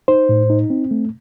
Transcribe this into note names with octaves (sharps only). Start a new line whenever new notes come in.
D#4 C5
A2
D#4
C4
A3